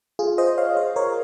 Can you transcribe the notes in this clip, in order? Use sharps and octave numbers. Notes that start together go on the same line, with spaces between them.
F4 G#4
C5 D#5
C#5 F5
C5 D#5
A#4 C#5